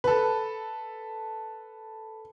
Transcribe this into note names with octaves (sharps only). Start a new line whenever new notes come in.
A4 B4